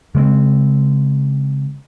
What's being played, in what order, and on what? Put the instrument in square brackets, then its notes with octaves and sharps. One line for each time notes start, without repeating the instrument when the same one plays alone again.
[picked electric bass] C#3 G#3 A3 C4